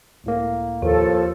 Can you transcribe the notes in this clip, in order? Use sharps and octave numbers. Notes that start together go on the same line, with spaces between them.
C#2 A2 A#3
D#2 F3 A4